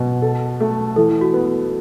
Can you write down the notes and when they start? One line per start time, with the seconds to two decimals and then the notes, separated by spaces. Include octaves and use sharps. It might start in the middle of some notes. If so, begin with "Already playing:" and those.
Already playing: B2
0.22 A4
0.60 A3
0.96 E3 A4
1.21 F#4
1.34 B3